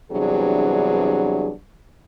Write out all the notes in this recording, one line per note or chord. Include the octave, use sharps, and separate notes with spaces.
E2 G2 C3 F#3 D4 G#4